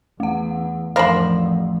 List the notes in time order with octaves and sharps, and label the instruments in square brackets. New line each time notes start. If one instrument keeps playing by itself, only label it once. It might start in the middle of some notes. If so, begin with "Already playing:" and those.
[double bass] E2 [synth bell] A3 F#5
[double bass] A1 F2 [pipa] D4 A#4 C5 [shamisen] F5 B5